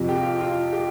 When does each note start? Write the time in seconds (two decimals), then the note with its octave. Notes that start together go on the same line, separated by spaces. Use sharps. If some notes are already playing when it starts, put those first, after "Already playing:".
Already playing: F2 C3 F3
0.09 G4
0.16 F4
0.23 G4
0.41 F4
0.73 G4